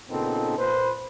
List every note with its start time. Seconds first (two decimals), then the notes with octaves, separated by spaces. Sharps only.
0.10 A#2 C#3 B3 C4 D#4 A4
0.59 A#2 B4 C5